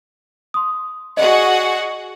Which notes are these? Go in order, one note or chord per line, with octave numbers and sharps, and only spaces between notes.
C6 D#6
F#4 G#4 D5 D#5 F#5